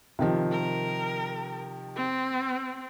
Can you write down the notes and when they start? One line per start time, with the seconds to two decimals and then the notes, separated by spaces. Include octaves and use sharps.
0.19 C3 D#3 F3
0.51 A#4
1.96 C4